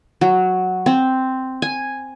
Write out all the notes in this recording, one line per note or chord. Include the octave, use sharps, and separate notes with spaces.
F#3
C4
G#5